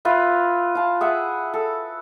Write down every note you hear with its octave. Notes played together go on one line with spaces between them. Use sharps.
F4 B4 E5
F4 A5
G#4 E5 F#5
A4